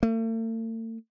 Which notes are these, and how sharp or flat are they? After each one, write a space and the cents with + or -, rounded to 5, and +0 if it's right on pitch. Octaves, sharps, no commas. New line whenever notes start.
A3 +45